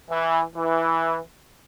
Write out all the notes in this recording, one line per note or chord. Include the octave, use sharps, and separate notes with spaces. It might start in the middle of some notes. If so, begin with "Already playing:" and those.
E3
E3